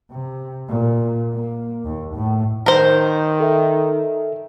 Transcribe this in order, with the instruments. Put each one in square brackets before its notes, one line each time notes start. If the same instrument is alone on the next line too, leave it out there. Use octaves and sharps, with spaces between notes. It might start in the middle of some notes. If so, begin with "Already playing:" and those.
[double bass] C3
A#2
A#3
D#2
A2
[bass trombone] D#3 [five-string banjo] A#4 C5
[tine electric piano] A4 E5